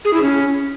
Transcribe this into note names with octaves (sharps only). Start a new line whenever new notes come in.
G#4
E4
C#4